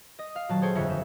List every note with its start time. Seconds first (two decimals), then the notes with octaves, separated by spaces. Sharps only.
0.19 D#5
0.36 F5
0.49 D#1 F#3 A5
0.62 G#4 A4 C5 C#5 G5 G#5
0.75 G1 F2 E5 G#5 C#7
0.89 G6 E7